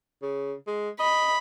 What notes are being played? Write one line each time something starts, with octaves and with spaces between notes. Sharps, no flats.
C#3
G#3
D#5 B5